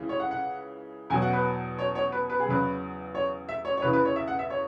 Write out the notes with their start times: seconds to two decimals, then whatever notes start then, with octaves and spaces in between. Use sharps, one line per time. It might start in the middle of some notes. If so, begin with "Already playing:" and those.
Already playing: C#2 C#3 E3
0.09 C#5
0.20 F#5
0.31 F#5
1.10 E2 B2 F#3 G#5
1.22 F#5
1.33 B4
1.78 C#5
1.95 C#5
2.12 B4
2.30 B4
2.40 G#4
2.46 E2 C#3 F#3 B4
3.15 C#5
3.49 E5
3.65 C#5
3.77 C#5
3.82 E2 C#3 E3 B4
3.93 B4
4.05 C#5
4.16 E5
4.28 F#5
4.39 E5
4.50 C#5